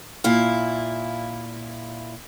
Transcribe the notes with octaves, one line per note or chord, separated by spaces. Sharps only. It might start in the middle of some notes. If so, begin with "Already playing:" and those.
A#2 E4 F5